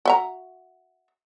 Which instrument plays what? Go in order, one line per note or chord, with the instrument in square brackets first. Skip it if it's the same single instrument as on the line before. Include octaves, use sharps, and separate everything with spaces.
[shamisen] F#4 E5 A#5